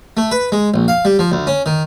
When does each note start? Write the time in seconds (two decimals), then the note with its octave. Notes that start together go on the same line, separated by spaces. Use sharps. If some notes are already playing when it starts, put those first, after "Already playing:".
0.17 A3
0.31 B4
0.52 G#3
0.74 A#1
0.88 F5
1.05 G3
1.19 F3
1.32 D2
1.47 C#4
1.66 D#3